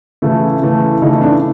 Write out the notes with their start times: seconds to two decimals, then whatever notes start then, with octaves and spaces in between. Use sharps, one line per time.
0.22 C#3 E3 A3 E4
0.62 C#3 E3 A3
1.02 C#3 E3 A3 D#4
1.21 D4